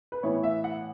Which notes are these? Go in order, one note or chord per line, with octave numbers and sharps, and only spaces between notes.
B4
A2 E3 B3 E4 C#5
E5
F#5